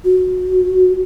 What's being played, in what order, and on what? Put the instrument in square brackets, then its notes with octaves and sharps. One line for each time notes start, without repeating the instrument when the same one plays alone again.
[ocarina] F#4